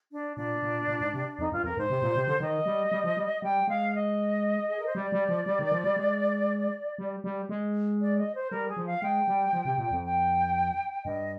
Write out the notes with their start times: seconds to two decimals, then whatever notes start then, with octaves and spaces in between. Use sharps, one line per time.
0.12 D4
0.37 A#2 D4
0.63 A#2
0.88 A#2
1.01 G#2
1.14 C3
1.38 F2 D#4
1.52 G2 F4
1.64 F2 A#4
1.77 G#2 C5
1.90 C3
2.02 A#2
2.16 C3
2.28 D3
2.40 D#3 D#5
2.66 G3
2.92 G3
3.04 F3
3.17 G3
3.42 G3 G5
3.68 G#3 F5
3.93 D#5
4.70 G#4
4.78 A#4
4.86 C5
4.95 G3 D5
5.12 G3
5.29 F3
5.46 G3
5.59 D#3
5.72 F3
5.84 G3
5.96 G#3
6.98 G3
7.24 G3
7.49 G#3
8.00 D5
8.17 D#5
8.34 C5
8.50 G3 A#4
8.68 G#4
8.77 F3
8.85 F5
9.02 G#3 G5
9.28 G3
9.53 F3
9.65 C3
9.78 A#2
9.91 F2
10.04 G5
11.05 G2 D#5